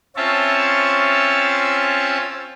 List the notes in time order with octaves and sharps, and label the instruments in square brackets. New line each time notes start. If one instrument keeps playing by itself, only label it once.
[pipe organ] C4 C#4 F4 C#5 E5 A5